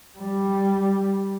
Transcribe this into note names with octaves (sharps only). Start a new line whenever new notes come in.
G3